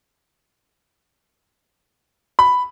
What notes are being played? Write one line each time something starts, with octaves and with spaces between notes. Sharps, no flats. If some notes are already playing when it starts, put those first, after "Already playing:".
B5